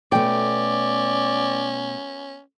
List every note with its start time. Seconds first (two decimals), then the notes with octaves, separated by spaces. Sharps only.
0.12 B2 A3 B3 C#4 D5 G5